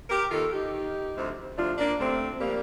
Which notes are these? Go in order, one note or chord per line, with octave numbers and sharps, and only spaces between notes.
G4 A#4
D#2 D#3 F4 A4
D#4 G4
D#2 D#3
D2 C3 F3
D2 C3 F3 D4 F4
A#3 D4
D2 C3 F3 A3 C4
C3 F3 G3 A#3